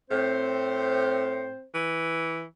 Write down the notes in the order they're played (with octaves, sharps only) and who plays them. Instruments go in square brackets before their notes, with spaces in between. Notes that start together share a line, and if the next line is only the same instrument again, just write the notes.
[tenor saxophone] A2 [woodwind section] C4 C5
[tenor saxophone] E3